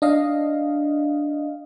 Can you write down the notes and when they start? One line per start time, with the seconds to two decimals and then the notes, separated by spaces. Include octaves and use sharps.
0.02 D4 D#5 F5